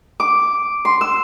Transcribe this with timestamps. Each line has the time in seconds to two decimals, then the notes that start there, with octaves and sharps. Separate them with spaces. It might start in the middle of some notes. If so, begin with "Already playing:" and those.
0.20 D6
0.85 C6
1.01 E6